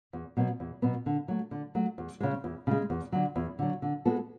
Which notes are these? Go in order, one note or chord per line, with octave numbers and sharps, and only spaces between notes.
E2
B2 F#3 B3
E2
B2 F#3 B3
D3
F#3 A3
D3
F#3 A3
E2
C#3 G#3
E2
C#3 G#3
E2
D3 F#3
E2
D3 F#3
D3
G#3 B3 F#4 A4